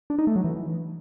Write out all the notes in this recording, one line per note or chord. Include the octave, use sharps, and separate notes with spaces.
D4
D#4
A3
F#3
E3